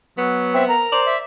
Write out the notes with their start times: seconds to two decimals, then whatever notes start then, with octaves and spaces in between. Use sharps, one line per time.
0.18 F#3 B3
0.54 C4 E5
0.69 A#4 A#5
0.92 C5 D5
1.06 E5